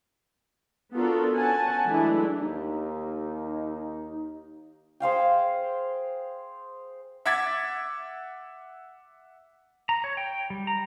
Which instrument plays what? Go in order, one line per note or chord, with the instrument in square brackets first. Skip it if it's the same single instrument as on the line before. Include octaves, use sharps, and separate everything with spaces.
[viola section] B3 D4 F4 F#4 A4 A#4
C#4 F#5 G#5 A5
E3 F#3 G#3 A3 D4 E4
[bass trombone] D#2 [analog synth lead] D#4
[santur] G#4 C5 F5 G5
[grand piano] E5 F#5 D6 G#6 A6 B6
[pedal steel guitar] A#5
C#5
G5
G3
A#5